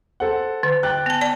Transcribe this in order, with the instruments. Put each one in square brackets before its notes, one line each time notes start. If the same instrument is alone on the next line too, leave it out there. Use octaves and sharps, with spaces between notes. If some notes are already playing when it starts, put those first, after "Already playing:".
[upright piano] A4 C5 F#5
[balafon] D3
[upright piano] G5 F#6 A6
[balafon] B3 A5
D5 A5